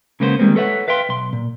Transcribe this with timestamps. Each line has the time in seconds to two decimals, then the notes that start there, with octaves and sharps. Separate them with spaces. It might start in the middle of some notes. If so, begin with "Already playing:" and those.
0.20 C#3 G#3 A#3 B3 E4 C5
0.39 D#3 G3 G#3 A#3 C4
0.56 A4 B4 C#5 E5 F#5
0.88 B4 E5 F5 G5 C6
1.09 B1 C6
1.33 A#2